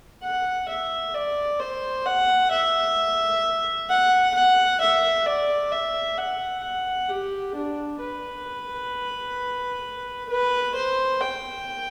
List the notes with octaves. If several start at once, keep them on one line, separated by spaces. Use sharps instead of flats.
F#5
E5
D5
C5
F#5
E5
F#5
F#5
E5
D5
E5
F#5
F#5
G4
D4
B4
B4
C5
G5